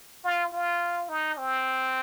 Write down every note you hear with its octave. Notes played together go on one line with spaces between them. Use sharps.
F4
F4
D#4
C4